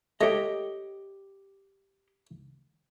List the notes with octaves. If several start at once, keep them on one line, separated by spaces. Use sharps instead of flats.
G#3 A3 G4 C#5 D#5